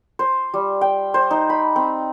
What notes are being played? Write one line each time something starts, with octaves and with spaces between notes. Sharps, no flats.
C5
G3
G5
C5
D#4
B5
C4